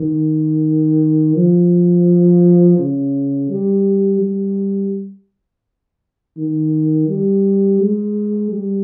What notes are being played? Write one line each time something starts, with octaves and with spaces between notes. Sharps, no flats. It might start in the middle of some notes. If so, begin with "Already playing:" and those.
Already playing: D#3
F3
C#3
G3
G3
D#3
G3
G#3
G3